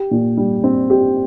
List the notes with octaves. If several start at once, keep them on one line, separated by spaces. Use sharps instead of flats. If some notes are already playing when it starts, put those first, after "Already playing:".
Already playing: G4
A#2
G3
C4
G4